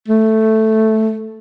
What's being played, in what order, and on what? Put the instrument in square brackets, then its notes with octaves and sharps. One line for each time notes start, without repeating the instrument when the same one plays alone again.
[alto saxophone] A3